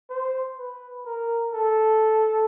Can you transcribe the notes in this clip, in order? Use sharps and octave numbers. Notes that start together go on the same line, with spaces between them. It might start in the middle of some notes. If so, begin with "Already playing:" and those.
C5
B4
A#4
A4